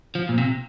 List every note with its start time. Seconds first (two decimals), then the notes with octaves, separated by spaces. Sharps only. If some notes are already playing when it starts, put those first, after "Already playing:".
0.15 F3
0.29 A#2
0.38 C3